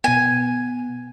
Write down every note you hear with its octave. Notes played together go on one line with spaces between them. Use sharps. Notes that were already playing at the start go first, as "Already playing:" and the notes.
B2 B3 G#5